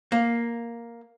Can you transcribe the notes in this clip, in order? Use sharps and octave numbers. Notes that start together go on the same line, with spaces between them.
A#3